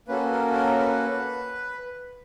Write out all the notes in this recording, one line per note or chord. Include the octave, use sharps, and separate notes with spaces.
A#3 C#4 F#4 A4 B4
A#4
A#4
B4